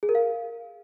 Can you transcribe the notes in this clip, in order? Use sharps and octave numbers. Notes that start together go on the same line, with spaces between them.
G#4
A#4
F5